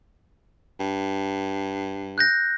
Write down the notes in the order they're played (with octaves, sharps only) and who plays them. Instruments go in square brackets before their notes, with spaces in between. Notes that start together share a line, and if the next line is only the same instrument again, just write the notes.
[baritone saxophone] G2
[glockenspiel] F#6 G6 A#6